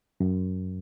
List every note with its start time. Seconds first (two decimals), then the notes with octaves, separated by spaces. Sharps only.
0.20 F#2